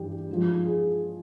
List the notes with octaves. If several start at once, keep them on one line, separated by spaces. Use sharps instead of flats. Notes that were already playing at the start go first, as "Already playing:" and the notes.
Already playing: G2 E3 G4
G#2 F3
G#4